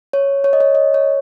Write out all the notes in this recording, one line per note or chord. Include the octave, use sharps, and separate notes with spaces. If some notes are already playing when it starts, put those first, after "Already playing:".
C#5
C#5
D#5
C#5
D#5
C#5